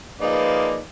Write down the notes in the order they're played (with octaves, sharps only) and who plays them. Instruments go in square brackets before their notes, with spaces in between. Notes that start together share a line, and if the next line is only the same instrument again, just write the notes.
[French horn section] F3 A#3 B4 [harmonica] D#4 G#4 D5